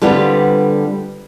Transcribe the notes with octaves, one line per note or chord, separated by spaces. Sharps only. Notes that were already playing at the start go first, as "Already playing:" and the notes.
D3 G3 B3 C4 F4